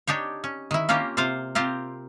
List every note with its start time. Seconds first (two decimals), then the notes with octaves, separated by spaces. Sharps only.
0.07 D4 D#4 G4 C#5
0.44 C#4
0.71 D#3 E4
0.89 A#3 C#4 F4 G4 A#4
1.17 C3 F4 C5 F5
1.55 C4 F4 G4 A#4